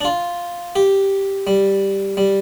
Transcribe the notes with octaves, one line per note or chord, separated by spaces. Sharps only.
D4
F4
G4
G3
G3